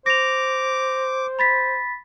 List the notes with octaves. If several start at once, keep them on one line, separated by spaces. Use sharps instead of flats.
C5 D6 A#6 F7
B5 A6 B6